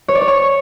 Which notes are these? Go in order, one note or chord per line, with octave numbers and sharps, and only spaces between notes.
C#5
D5
C#5
C#6